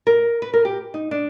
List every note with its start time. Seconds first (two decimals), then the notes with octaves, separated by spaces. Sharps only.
0.07 A#4
0.42 B4
0.54 A#4
0.65 G4
0.94 D#4
1.11 D4